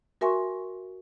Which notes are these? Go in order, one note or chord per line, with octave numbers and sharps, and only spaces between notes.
F#4 A#4 E5 G#5 C6 C#6